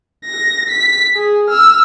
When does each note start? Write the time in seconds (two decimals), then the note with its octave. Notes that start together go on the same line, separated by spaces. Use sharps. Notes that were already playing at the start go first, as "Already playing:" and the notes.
0.25 A#6
0.70 B6
1.16 G#4
1.49 E6 F6